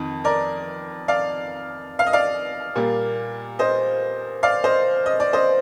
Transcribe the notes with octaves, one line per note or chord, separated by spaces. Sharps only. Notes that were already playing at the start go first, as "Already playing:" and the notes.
Already playing: F2 D#3
A#4 D5
D5 F5
F5
D#5
D5 F5
A#2 G3 A#3
C5 D#5
D5 F5
C5 D#5
D#5
D5
C5 D#5